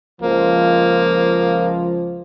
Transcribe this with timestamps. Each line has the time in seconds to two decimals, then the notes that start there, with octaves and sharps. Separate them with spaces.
0.22 C#2 F3 A#3